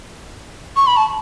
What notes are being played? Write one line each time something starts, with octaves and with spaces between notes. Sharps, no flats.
C#6
B5
A5